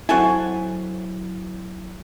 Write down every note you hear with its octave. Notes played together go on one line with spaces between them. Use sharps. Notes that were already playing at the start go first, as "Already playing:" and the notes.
F#3 C4 E4 F#4 A4 G#5